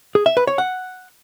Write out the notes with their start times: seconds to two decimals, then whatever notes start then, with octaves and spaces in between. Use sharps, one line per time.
0.15 G#4
0.26 E5
0.37 B4
0.47 C#5
0.58 F#5